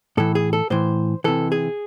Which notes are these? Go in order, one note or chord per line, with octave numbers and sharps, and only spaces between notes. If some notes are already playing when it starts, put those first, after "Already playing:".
A2 E3 A4
G#4
A4
A2 E3 C5
C3 E3 A4
G#4